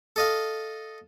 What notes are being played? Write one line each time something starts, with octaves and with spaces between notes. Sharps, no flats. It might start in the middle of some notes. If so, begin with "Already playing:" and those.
A4 D#5 F5